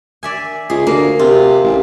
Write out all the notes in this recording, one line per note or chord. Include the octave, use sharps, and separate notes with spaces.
D5 E5 G#5
C#2 G#4
D2 A#3
C3 F4
A1